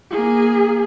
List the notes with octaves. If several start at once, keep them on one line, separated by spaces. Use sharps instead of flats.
A#3 G#4